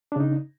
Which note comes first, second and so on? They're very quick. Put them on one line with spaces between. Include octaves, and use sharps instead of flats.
D4 C#3 D#4